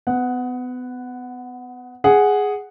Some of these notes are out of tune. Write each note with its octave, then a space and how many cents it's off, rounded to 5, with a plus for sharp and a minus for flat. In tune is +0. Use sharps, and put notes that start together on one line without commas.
B3 +30 F#5 +0
G#4 +0 F#5 +0